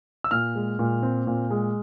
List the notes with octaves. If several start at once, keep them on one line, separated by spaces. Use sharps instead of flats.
E6
A#2 F6
G#3
A#2
C4
A#2
G#3